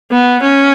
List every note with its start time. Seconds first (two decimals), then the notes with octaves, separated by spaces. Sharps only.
0.12 B3
0.42 C#4